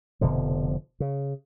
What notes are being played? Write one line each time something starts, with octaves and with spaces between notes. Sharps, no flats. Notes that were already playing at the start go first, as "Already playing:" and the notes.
F1 B2 D3 F3
C#3